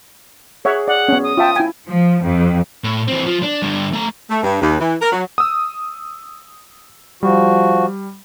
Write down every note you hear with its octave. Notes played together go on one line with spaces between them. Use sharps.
G#4 C#5 E5 F#5
D5 F#5
B3 C#4
D#6
F4 E5 G5 A5
E4 G5 G#5
F3
F2
A2
E3 C4
F3
D4
G2 D3
A3 A#5
A3
G2
D#2
E3
A#4
F#3
D#6 E6
F3 G3 F#4